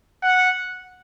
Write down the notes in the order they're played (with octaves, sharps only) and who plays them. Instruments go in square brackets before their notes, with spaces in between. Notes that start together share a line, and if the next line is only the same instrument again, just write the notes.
[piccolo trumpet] F#5